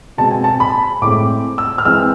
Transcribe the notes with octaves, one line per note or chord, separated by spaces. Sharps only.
B2 G#3 C4 A5
G#5
A5
B5
A2 G#3 C4 D6
E6
F6
E3 G#3 C4 E6